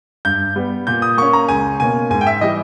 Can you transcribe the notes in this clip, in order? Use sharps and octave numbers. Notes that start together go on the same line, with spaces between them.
G2 G6
G3 B3
A#2 G6
D#6
A#3 C#4 C#6
A#5
C#2 G#5
B2 A#3 C#4 G#5
G#2 G#5
G5
E5
E3 G3 D#5